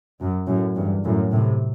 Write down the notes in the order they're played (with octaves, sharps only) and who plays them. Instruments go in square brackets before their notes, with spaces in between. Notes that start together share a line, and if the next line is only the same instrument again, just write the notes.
[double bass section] F#2
F#2 A2
E2 G2
F#2 A2
A2 C3